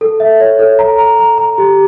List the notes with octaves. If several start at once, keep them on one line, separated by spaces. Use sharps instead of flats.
A4
E5
C#5
A4
A#5
A#5
A#5
A#5
G4